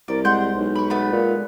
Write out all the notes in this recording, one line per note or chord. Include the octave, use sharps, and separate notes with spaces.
C2 A#4 D5
G#3 F#5 C6 G6
B1
B5 C#6
A3 B3 B5
A#2